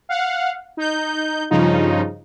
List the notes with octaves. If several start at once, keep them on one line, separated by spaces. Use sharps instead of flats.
F5 F#5
D#4 G6
G2 C#3 F3 D#4 F4